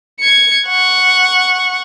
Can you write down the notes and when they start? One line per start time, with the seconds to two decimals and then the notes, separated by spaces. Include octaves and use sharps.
0.20 G#6 C#7
0.67 F#5 C#6